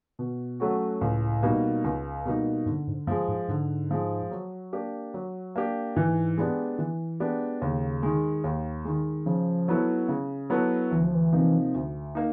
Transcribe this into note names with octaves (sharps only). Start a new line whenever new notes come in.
B2
F#3 A3 C#4 F#4
C#2 A2
B2 G3 A#3 D#4
C#2
B2 G3 A#3 D#4
G#2 D3
G#2
G2 F3 G#3
G#2
G#2 D3
F3 G#3
F#3
A#3 D4 G4
F#3
A#3 D4 G4
G#2 E3
G#3 B3 D4 G4
E3
G#3 B3 D4 G4
D#2 C#3
D#3 G#3
D#2
D#3 G#3
C#3 F3
F#3 B3 E4 A4
C#3
F#3 B3 E4 A4
D2 E3
F3
E3
C3 F3 A#3 D#4
D2
A#3 D#4